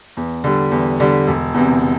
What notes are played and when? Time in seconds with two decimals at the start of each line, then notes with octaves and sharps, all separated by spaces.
0.17 E2
0.44 D3 G3
0.71 E2
1.00 D3 G3
1.27 E1
1.54 E2 C3